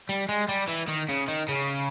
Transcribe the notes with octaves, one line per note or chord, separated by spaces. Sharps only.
G3
G#3
G3
E3
D#3
C#3
D#3
C#3